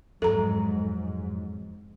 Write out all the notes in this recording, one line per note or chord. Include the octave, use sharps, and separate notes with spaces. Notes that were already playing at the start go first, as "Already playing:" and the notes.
F2 G#2 F#3 A4 A#5